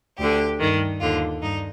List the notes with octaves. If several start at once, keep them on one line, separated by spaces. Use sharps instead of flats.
D2 D3 G4
G2 D#3
D#2 D3 F4
G2 D#4